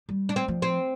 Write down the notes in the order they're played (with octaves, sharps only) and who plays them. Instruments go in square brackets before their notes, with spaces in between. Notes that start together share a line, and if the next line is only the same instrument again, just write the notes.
[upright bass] G3
[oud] D4
C4
[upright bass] F3
[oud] C4